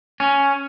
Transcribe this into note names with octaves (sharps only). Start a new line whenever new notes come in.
C#4